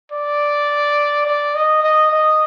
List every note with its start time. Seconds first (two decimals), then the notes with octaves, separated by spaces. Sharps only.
0.12 D5
1.26 D5
1.55 D#5
1.83 D#5
2.12 D#5